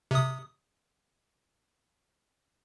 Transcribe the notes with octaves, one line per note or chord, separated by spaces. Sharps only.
C3 D#6